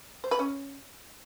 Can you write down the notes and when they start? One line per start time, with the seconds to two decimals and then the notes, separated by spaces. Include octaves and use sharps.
0.24 C5
0.31 B4
0.39 C#4